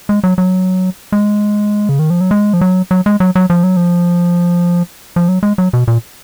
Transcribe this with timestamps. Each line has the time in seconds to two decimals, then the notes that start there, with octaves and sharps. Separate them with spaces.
0.09 G#3
0.24 F#3
0.38 F#3
1.12 G#3
1.89 C#3
1.99 D#3
2.10 F3
2.21 F#3
2.31 G#3
2.53 F3
2.61 F#3
2.91 F#3
3.06 G#3
3.20 F#3
3.35 F#3
3.50 F3
3.63 F#3
3.77 F3
5.16 F3
5.28 F#3
5.43 G#3
5.58 F#3
5.73 B2
5.88 A#2